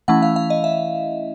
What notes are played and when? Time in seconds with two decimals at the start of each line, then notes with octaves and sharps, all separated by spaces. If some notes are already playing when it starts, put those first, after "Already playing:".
0.08 E3 A3 C#4 E4 F#5
0.22 F5
0.36 F5
0.50 D#5
0.64 E5